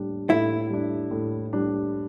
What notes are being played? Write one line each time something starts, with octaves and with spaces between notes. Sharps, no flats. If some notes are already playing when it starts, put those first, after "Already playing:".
Already playing: A2 G3 D4
A2 E4
G3 D4
A2
G3 D4